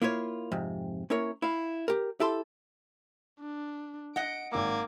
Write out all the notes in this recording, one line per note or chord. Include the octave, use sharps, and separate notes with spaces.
A#3 E4 F4 C#5
F2 G#2 C3
A#3 C#4 E4 A#4 C#5
E4 F5
G4 A#4
E4 G4 A4 A5 C6
D4
D#5 F#5 D7
G#1 A#3 D6 E6 G#6